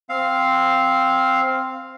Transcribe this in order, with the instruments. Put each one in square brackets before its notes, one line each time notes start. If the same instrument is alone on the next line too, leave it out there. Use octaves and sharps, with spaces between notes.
[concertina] C4 F5